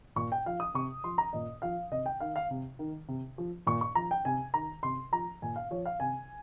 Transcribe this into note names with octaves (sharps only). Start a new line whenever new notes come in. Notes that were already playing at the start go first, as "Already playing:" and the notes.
A#2 C#6
G5
F3 F5
D#6
C3 C#6
F3 C6
A#5
A#2 D#5
F3 F5
C3 D#5
G5
D#3 F5
F5
C3
D#3
C3
F3
A#2 C#6
C#6
F3 A#5
G5
C3 G#5
D#3 A#5
C3 C6
F3 A#5
A#2 G#5
F5
F3 C#5
F5
C3 G#5